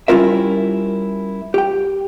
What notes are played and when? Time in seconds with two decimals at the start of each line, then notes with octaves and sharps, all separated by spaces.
0.08 G3 C#4 E4 F4 A#4 E5
1.54 G4 G5